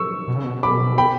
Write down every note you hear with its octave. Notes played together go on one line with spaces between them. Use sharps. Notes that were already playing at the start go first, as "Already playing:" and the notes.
Already playing: C#6 E6
B2
C#3
B2
B5 D6
G5 B5